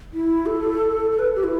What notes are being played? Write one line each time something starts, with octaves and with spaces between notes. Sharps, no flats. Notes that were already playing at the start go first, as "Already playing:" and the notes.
E4
A4
A4
B4
G4
E4